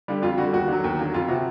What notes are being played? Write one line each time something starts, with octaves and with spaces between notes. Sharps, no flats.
D3 G3
F2 F4
D3 G3 F#4
D#2 F#4
D3 F#3
D#2
D3 F#3
F2 F4
C3 F3 F#4